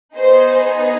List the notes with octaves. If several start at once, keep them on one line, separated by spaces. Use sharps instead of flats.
B3 D#4 G#4 C5